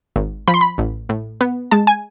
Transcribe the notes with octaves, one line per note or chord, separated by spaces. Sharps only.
G#1
F3 B5
C6
B5
A1
A2
B3
G#3 A5
G#5